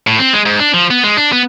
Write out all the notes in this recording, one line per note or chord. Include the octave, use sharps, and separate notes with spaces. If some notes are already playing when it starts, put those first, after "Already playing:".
A2
C4
G#3
G#2
D4
F3
B3
G#3
D4
B3